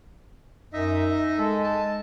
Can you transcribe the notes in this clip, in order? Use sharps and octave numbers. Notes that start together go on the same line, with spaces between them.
F#2 D#4 D#5 E5
G#3 A4
A5